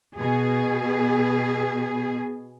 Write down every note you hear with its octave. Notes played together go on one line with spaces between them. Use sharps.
B2 G#4